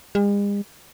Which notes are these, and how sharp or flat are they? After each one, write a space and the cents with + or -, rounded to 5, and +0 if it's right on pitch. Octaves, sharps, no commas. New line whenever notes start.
G#3 -45